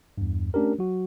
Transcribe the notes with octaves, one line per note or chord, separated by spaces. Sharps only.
E2 G2
A3 C#4 D4 G4 A#4
F#3 F#4